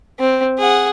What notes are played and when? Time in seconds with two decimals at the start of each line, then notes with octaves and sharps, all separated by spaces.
0.20 C4
0.59 G#4 F#5